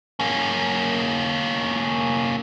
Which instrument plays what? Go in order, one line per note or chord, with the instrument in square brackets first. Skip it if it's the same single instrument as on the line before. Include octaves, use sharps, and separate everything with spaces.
[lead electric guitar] A#3 C#4